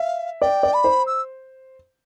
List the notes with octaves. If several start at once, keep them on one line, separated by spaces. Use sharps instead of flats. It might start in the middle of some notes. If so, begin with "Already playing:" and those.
Already playing: E5 F5
D5 G5
D5
B5
C5
E6